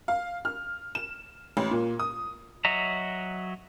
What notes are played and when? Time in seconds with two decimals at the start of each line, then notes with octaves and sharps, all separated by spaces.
0.08 F5
0.45 F6
0.95 E7
1.57 A1
1.71 A#2
1.99 D#6
2.65 F#3 F#4 D#5 E5 A#5